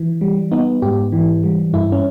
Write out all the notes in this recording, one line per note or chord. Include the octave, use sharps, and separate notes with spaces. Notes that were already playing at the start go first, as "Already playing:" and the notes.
Already playing: E3
G3
B3 D#4
G#2 G4
E3
G3
G2 E4
C#4